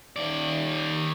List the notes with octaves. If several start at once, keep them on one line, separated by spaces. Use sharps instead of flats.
D#2 D5